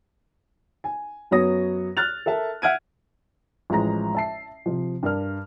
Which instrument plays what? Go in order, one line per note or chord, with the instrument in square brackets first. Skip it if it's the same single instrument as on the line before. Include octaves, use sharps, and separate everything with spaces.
[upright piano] G#5
F#2 F#3 B3 C#5 D#6 A#6
F6 F#6 A6 F7
A4 A#4 E5 A5
E5 F#5 F6 G#6 D7 D#7
A1 F3 G#3 A#5 A#6
E5 A5 C7
C3 F3
G2 D4 A#4 F6